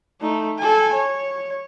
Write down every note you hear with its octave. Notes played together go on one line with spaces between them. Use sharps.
A3 D#4
A4 G#5
C#5